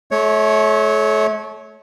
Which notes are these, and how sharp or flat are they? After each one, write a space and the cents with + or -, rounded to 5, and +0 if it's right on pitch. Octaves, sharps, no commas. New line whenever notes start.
A3 -35 C#5 +0